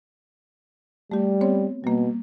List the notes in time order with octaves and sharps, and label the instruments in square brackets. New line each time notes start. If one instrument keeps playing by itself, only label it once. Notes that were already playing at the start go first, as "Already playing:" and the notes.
[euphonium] G3 [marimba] A3 G4
[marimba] B3 C4 C#5
[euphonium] B2 [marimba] G3 A#3